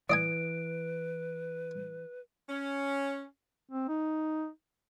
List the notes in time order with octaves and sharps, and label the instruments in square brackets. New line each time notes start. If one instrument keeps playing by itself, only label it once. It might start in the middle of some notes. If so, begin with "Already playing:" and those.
[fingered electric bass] E3 [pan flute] B4 [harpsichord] D5 D#5 G#5 [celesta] D7
[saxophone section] C#4
[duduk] C4
D#4